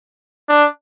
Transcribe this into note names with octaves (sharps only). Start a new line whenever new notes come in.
D4